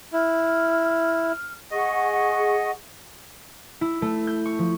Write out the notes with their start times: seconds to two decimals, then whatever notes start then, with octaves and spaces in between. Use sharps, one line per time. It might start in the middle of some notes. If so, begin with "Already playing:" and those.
0.13 E4 F6
1.71 G#4 D#5 F#5 C#6
3.81 E4
4.02 A3
4.27 G6
4.46 C#6
4.59 F3